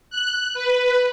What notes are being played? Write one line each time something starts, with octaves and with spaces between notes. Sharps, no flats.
F#6
B4